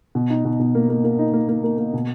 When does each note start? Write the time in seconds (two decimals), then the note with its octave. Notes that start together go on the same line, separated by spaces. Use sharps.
0.15 B2
0.30 D#4
0.45 B2
0.59 B2
0.75 A#3
0.89 A#3
1.04 A#3
1.19 D#4
1.33 A#3
1.49 A#3
1.64 A#3
1.79 A#3
1.94 B2